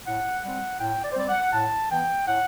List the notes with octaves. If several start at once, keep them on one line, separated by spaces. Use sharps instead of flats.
A2 F#5
G3 C4 F#5
A2 G5
D5
C5
G3 C4 D5
F#5
A2 A5
E3 B3 G5
A2 F#5